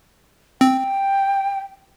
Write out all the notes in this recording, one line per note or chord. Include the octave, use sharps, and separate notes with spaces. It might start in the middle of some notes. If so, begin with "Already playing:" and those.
C4 G5